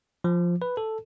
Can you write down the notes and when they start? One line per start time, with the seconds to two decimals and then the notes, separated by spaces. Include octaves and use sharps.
0.24 F3
0.62 B4
0.77 A4